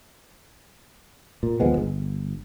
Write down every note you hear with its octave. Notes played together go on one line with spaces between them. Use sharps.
A#2
D#2 F3 G#3 B3
G1